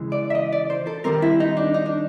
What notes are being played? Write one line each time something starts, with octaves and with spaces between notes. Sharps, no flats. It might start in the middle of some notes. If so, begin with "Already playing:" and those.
Already playing: C#3 E3 G#3
D5
E5
D#5
D5
C5
A4
D#3 G3 C4 A#4
E4
D#4
D4
D#4
D4